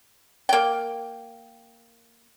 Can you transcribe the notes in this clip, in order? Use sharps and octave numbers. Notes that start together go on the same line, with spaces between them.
A#3 G5